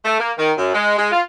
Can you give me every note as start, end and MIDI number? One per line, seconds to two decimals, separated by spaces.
0.04 0.16 57
0.19 0.32 58
0.38 0.51 51
0.57 0.73 42
0.74 0.97 56
0.98 1.09 56
1.11 1.21 65